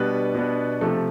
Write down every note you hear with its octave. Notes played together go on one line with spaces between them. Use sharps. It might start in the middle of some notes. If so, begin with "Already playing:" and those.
Already playing: B2 G3 B3 D4 B4
B2 G3 B3 D4
C3 F3 A3 A4